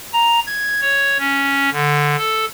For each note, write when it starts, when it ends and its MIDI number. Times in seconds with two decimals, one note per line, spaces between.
0.13 0.39 82
0.47 0.81 92
0.81 1.18 73
1.18 1.70 61
1.72 2.16 50
2.18 2.45 69